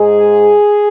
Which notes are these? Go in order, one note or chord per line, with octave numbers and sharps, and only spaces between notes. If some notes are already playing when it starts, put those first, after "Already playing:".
Already playing: G#2 G#3 G#4